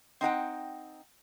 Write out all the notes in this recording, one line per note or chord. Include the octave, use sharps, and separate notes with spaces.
C4 D#4 F#5 G5